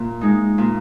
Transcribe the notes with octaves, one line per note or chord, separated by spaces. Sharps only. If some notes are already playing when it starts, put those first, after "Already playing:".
Already playing: A#2
G#3 D#4
A#2